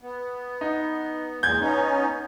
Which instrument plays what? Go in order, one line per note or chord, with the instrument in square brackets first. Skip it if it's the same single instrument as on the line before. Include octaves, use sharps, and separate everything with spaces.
[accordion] B3
[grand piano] D#4
[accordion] E2 A#2 G#3 [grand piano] G6 G#6
[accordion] B3 C#4 D#4